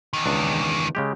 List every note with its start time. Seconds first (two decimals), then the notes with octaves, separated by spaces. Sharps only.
0.13 E2 D#3
0.26 C#2 D4
0.95 C#3 G#3 G4